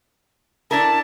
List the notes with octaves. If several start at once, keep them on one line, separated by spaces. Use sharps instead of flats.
D4 E4 A#4 A5